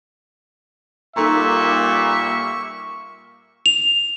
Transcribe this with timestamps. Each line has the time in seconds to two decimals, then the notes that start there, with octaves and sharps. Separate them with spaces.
1.16 A#2 G3 A#3 D#4 A4 E5 A#5 C#6
3.66 F7